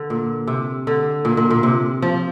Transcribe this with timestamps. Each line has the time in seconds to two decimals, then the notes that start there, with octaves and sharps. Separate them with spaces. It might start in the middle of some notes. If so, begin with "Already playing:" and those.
Already playing: D3
0.10 A#2
0.47 C3
0.87 D3
1.25 A#2
1.37 A#2
1.51 A#2
1.63 C3
2.02 F3